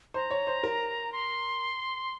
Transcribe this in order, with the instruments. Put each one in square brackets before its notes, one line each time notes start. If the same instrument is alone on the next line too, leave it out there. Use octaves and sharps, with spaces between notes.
[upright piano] C5 [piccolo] A#5
[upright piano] C#5
C5
A#4
[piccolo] C6